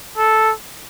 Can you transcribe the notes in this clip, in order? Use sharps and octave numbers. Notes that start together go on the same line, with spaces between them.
A4